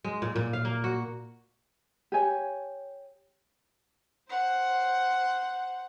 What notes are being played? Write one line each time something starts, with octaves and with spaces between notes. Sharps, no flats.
G#3
A#2
A#2
F5
A#3
F#4
G4 C#5 G#5
C5 F#5